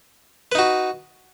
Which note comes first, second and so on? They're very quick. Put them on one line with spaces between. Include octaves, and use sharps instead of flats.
B4 D#4 F#4